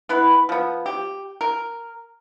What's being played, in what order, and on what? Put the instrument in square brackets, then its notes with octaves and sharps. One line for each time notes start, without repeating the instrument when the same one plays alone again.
[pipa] B3 E4 B4
F3 B3
G4
A#4